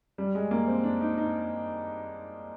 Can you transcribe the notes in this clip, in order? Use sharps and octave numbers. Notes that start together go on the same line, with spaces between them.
G3
G#3
A#3
C4
D4
D#4
D#4